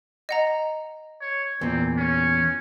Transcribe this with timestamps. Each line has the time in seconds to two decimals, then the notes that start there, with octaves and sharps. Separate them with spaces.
0.29 D#5 F#5 A#5
1.21 C#5
1.61 E2 A#2 C4
1.97 C#4